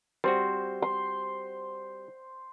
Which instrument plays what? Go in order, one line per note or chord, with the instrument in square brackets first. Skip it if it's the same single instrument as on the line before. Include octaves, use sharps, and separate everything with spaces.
[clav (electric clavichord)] G3 C4 F#4 [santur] C5
[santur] C6